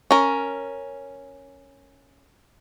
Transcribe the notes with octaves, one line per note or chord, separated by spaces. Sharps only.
C#4 A#4